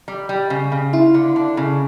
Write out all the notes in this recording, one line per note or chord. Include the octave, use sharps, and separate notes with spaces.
G3
G3
C#3
C#3
E4 F4
D3
D4
C#3